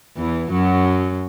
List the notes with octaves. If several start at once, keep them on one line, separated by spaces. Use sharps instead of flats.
E2 E3
F#2 F#3